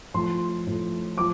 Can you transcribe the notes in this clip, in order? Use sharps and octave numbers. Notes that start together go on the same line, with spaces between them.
A2 F3 C6
A2 F3
F3 D6